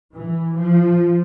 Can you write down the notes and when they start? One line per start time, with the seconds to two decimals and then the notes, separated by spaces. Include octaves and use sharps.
0.13 E3
0.56 F3